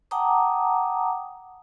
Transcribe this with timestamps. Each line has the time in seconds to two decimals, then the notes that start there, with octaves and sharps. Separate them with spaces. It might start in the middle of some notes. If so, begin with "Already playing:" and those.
0.11 F#5 G5 A5 A#5 D6 D#6